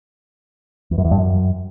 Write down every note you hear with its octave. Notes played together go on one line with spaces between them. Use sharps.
E2
F#2
E2
G2
F#2